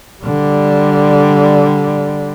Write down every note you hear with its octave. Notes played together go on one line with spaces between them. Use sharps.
D3 G3